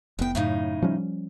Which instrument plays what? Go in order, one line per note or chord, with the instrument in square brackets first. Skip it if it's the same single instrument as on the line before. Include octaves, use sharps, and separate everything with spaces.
[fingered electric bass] F1 B3 [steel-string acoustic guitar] A2 G5
[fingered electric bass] F#2 [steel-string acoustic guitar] A2 C#3 D#4
[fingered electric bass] F3 G3 C#4